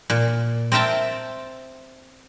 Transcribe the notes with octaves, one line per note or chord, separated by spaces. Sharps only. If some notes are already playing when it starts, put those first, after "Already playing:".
A#2
C4 A#4 E5 G5 A5